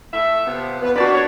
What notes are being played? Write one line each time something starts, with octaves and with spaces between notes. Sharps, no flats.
A3 E5
C3 F3 B3
E2 B3 B4
A#3 D4 D#4 F#4 D5 A5 B5
C#5